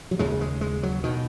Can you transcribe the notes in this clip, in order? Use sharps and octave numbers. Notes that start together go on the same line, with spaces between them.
F#3
D#2 C#3 G#3
G#3
G#3
F#3
B2 D#3